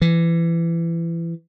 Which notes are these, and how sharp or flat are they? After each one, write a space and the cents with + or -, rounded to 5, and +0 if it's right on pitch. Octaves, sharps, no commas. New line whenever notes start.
E3 +25